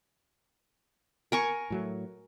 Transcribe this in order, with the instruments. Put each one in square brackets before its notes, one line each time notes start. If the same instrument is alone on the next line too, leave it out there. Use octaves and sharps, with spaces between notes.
[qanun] A#4 G#5 C#6
[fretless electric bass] A2 F#3 A3